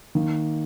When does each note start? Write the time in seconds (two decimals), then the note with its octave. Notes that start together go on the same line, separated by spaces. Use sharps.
0.15 D#3 A#3 D#4